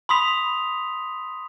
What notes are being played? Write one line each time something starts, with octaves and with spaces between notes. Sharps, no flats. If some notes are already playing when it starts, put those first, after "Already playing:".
B5 C6 D#6 B6 F7